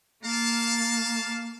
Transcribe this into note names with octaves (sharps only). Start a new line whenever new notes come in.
A#3 F5 A5